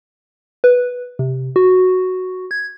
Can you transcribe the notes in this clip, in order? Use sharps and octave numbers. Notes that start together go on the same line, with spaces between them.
B4
C3
F#4
G#6